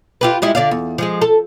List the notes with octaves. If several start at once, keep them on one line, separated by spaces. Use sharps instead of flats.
F4 G4 B4
G3 G#3 E4
D3 D5 F5
E2
F3 G#3 G#4
A4